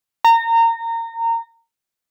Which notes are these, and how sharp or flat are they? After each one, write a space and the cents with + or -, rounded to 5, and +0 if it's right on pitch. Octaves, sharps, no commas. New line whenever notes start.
A#5 -25